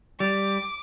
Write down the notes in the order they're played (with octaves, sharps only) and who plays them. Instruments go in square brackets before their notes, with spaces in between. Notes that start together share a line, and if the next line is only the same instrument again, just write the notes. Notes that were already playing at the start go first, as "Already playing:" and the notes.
[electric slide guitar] G3 [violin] D6